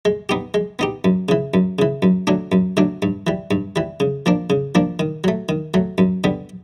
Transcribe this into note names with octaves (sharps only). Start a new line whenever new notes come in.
G#3
B3 D#4 G4
G#3
B3 D#4 G4
F#2
C#3 E3
F#2
C#3 E3
F#2
D3 F#3 A3 D4
F#2
D3 F#3 A3 D4
G2
E3 G3
G2
E3 G3
C#3
F3 A#3 D4
C#3
F3 A#3 D4
D#3
F#3 A3
D#3
F#3 A3
F#2
D3 G3 B3